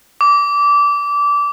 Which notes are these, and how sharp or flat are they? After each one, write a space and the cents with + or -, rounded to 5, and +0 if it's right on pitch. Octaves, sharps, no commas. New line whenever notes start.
D6 -20